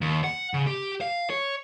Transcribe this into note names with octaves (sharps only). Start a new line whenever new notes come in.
D#2
F#5
C#3
G4
F5
C#5